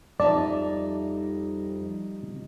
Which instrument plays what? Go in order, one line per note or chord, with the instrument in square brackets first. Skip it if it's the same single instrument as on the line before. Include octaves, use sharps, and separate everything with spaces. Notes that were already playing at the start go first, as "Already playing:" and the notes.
[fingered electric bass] F2 [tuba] G3 [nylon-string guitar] D#4 E5 A5 [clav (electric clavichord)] D5